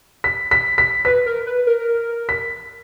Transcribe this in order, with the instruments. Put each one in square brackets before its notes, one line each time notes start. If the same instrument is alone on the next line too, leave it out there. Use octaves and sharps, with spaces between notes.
[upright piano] B6
B6
B6
[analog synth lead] B4 [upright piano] B6
[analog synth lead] A#4
B4
A#4
[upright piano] B6